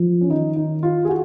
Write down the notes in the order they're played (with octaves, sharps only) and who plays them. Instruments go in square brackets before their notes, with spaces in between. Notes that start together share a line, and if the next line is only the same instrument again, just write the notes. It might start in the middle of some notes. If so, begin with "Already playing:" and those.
Already playing: [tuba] F3
[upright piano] C#4
[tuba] D#3 [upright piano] D#4
[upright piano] D#4
F4
G#4
F#4